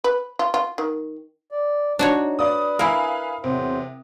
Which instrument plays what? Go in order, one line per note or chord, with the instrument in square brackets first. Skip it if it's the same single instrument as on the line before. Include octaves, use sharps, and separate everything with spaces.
[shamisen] B4
F4
F4
D#3
[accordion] D5
[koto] D4 F#4 C#5 [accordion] D#4
[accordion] B4 [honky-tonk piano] D5 D#6
[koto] E4 A#4 [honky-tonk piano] F5 G#5 B5
[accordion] E2 F#3 C5 [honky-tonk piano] C3